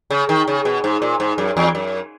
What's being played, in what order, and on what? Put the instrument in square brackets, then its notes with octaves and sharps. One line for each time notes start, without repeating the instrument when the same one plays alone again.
[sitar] C#3
D#3
C#3
B2
G#2
A#2
G#2
F#2
E2
F#2